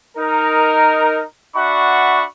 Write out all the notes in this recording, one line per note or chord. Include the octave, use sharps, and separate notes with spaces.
D#4 A#4
D4 F#4 E5 F#5 B5 C#6